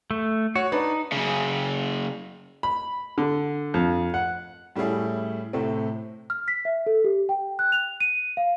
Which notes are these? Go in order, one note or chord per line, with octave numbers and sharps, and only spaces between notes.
A3
F#4 C#5
D4 D#4 B4
F#2 C#3
B5
D3
F2
F#5
A2 G3 A3 C#4 E4 G#4
A2 C3 A3 C4
F6
B6
E5
A4
G4
G5
F#6
F7
D#7
F5